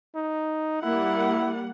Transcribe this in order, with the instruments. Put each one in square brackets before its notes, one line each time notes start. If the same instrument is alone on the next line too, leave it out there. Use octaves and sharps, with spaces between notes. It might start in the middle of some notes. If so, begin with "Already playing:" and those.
[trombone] D#4
[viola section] G3 A#3 F#5 [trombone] E4